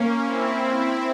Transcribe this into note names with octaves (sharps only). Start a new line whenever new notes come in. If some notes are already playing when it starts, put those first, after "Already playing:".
Already playing: A#3 C#4
C4 E4